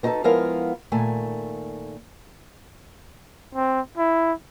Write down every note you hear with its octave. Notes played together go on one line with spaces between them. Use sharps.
B3 D#4 F#4 G4 A4 B4
F3 G#3 B3 E4 A#4 F5
A#2 D#3 A3 G#5
C4
E4